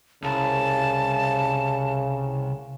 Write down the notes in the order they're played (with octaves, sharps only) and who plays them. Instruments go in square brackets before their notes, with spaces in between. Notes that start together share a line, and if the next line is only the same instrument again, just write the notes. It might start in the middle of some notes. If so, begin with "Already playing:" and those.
[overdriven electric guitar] C2 [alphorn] C#3 [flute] A5